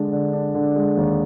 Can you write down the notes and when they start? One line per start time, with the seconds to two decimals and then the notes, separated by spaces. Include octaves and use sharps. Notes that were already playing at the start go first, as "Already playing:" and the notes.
Already playing: D3 G#3 D4
0.12 D3
0.33 D4
0.54 D3
0.76 G#3
0.97 D#2